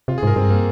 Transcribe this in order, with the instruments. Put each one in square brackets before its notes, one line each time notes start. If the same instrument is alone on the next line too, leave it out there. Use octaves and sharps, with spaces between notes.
[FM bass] C3 [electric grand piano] F4
[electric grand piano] G#4
[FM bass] G#2 [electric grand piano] A#4
[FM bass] G2 [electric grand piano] C4
[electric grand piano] A#3